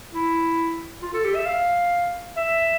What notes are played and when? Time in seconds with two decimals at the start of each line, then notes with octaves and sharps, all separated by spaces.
0.13 E4
1.02 F4
1.14 A4
1.25 G4
1.35 E5
1.46 F5
2.37 E5